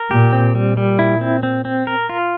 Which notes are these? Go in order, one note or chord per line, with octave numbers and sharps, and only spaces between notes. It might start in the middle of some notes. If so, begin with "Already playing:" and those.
Already playing: A#4
A#2 G4
C4
A#2 G3
G3
E4
C4
C4
C4
A#4
F4